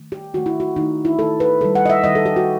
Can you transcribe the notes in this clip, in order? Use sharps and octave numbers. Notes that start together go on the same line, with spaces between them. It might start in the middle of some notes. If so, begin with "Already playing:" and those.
Already playing: D#3 A3
G4
D#3 A3 F#4
E4
F#4
D#3 A3 D#4
E4
D#3 A3 A4
B4
D#3 G3 A4
F#5
D#5
E5
D#3 G3 D#5
A4
G4
F#4